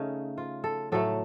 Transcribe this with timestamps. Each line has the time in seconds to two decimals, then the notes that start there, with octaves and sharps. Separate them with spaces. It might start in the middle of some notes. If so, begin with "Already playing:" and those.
Already playing: C#3 A3 C#4 D#4
0.38 F4
0.64 A4
0.92 A2 F#3 A3 A4